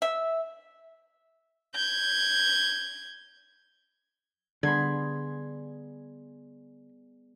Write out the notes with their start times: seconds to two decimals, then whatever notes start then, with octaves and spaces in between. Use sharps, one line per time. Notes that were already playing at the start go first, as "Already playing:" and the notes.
0.02 E5
1.75 G6 G#6
4.63 D3 G3 B3 G#4 B5 C6 G#6